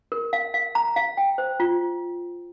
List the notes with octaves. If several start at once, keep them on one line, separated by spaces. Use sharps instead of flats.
A#4
F5
F5
A#5
F5
G5
C5
F4